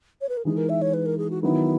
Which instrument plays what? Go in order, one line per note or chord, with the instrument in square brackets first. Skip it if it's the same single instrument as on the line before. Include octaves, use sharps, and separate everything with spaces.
[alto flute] C#5
B4
A#4
[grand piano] E3 G#3 D#4 [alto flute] G#4
[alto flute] A#4
E5
C#5
B4
A#4
G#4
F#4
[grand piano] D#3 F#3 B3 D#4 [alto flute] E4